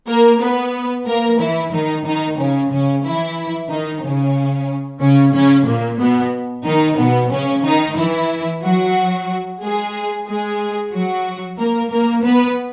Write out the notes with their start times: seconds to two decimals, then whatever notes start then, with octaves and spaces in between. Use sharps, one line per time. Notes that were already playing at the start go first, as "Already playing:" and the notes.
0.08 A#3 A#4
0.41 B3 B4
1.07 A#3 A#4
1.40 E3 E4
1.73 D#3 D#4
2.05 D#3 D#4
2.38 C#3 C#4
2.71 C#3 C#4
3.04 E3 E4
3.69 D#3 D#4
4.03 C#3 C#4
5.01 C#3 C#4
5.34 C#3 C#4
5.67 A#2 A#3
6.00 B2 B3
6.65 D#3 D#4
6.98 B2 B3
7.31 C#3 C#4
7.64 D#3 D#4
7.97 E3 E4
8.63 F#3 F#4
9.61 G#3 G#4
10.27 G#3 G#4
10.93 F#3 F#4
11.58 A#3 A#4
11.92 A#3 A#4
12.24 B3 B4